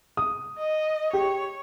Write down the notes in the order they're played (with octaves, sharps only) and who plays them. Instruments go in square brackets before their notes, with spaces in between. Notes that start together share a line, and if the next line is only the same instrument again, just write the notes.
[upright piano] D#6
[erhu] D#5
[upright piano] G4 [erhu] C#5